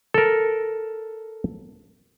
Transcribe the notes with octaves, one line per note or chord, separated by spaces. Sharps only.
A4 A#4